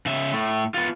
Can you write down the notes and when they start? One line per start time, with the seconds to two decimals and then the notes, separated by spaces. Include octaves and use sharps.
0.06 C#3 E5
0.33 A2 A3
0.74 B3 F4